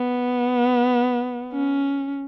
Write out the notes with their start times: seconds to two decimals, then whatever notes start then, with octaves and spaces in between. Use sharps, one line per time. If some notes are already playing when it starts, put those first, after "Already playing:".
Already playing: B3
1.53 C#4